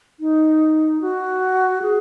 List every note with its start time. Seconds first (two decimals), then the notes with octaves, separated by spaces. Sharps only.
0.20 D#4
1.01 F#4
1.82 G#4